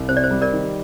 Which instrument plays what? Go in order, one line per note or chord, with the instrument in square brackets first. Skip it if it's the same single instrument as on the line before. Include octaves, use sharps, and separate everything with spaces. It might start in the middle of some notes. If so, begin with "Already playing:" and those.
Already playing: [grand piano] C2
[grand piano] C3 [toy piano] C5
[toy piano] D5
C5
[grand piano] G3
[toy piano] A#4 D5
[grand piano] D#3